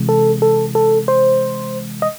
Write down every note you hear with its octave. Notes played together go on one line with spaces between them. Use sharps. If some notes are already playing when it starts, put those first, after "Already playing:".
Already playing: C3 E3 G#3
A4
A4
A4
C5
D#5